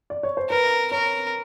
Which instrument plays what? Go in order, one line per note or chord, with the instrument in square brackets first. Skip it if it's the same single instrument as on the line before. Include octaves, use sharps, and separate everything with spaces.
[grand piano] D5
C#5
C5
[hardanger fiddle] A#4 [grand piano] B4
[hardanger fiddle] A#4 [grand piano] C#5